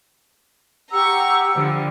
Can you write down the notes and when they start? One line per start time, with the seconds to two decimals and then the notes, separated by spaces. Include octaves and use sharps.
0.91 G4 F#5 A#5 C#6 E6
1.54 D3 F3 G3